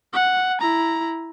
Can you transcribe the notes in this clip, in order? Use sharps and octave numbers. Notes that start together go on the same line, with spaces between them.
F#5
E4 A#5